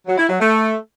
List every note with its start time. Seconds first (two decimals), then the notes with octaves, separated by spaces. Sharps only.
0.07 F#3
0.18 E4
0.29 F#3
0.40 A3